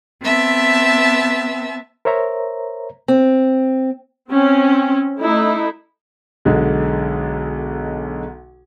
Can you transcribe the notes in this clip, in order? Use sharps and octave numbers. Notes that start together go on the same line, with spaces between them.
B3 C4 E5 A5
A#4 C5 C#5 E5 A#5
C4
C4 C#4
A3 D#4 E4
B1 D3 G#3